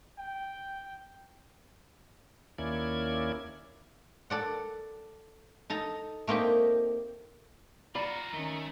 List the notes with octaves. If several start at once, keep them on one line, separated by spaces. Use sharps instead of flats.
G5
D#2 A#3 C#4 E4 D5 G#6
A4 D5 F#5
D#4 A4 A#5
A3 A#3 C4 D#4 G4
F4 F#4 D5 A#5 B5
D#3 A3 C#4